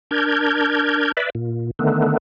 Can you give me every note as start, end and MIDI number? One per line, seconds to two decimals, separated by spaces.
0.11 1.12 62
0.11 1.12 70
0.11 1.12 91
0.11 1.12 92
1.17 1.30 71
1.17 1.30 74
1.17 1.30 76
1.35 1.71 46
1.79 2.17 50
1.79 2.17 51
1.79 2.17 57
1.79 2.17 59